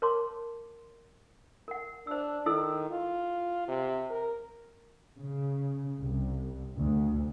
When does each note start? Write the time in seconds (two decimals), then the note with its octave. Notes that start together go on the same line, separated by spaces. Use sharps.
0.02 A#4 C#5 A5 C6 D6
1.68 A#4 F#5
2.07 D4 C5 E6
2.46 D#3 E4 A4 E6
2.90 F4
3.68 C3
4.10 A#4
5.19 C#3
5.99 C2
6.76 D2